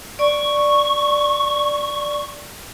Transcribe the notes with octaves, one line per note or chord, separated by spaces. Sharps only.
D5 C#6